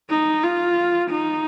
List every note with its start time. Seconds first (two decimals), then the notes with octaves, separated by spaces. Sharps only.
0.10 D#4
0.43 F4
1.11 D#4